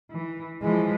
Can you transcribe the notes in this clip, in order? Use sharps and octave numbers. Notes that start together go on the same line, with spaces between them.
E3
E3 F3 G#3